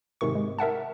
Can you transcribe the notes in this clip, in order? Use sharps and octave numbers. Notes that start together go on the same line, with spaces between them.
G#2 C3 D#3 C#6
G#3
A#4 E5 F#5 A5